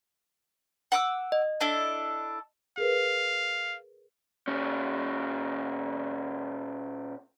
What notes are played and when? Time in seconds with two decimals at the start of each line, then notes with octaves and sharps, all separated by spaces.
0.92 F#5 D6 E6
1.32 D#5
1.61 D4 E4 A4
2.78 G#4 A#4 B4 F5
4.48 A#2 C#4